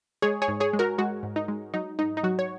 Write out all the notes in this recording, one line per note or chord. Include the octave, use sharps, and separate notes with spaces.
G#3 G#4 C#5
G#4 C#5
G#2
G#4 C#5
G#3
F#4 A#4
G#3 F#4
G#2
D#4
G#3
F#3 D#4
G#2 D#4
D#4
F#3 F#4
C#5